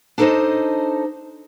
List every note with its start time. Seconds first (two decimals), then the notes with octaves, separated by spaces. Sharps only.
0.18 D4 D#4 A4 B4 C5 D#5